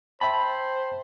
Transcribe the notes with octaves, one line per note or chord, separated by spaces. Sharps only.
C5 E5 G5 A5 B5